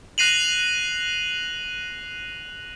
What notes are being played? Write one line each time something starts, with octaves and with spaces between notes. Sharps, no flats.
F#6 A#6 C7 D#7 F7 F#7